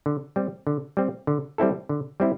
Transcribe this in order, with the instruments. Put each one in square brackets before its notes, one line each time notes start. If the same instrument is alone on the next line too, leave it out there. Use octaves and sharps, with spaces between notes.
[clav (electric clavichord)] D3
G3 C4
D3
G3 C4
D3
G3 C4 E4 A4
D3
G3 C4 E4